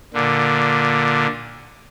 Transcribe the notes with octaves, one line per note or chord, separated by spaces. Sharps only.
A#2 D3